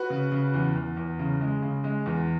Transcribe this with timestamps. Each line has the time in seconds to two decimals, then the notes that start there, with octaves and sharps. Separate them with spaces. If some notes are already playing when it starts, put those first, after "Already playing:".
Already playing: F#4 B4
0.10 C#3
0.32 C#3
0.54 E2
0.75 E2
0.97 E2
1.19 C#3
1.41 G#3
1.62 C#3
1.84 G#3
2.06 E2